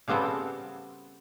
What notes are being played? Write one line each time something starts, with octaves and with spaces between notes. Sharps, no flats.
C#3 G3 B3 C4 A4